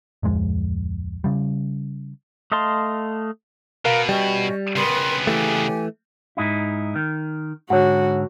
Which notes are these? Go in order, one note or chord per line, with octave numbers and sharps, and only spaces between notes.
D1 F2 G#3
C#3 G3
A3 D#5 F5 A5 C6
B2 A#4 F5
G3 C#4 C#5 D#5 G5
C#3 B3 A#4 B4 C6
E3 A3 G4 G#5
G#2 D#4 E4
D#3
G#2 D3 F#4 C#5 F#5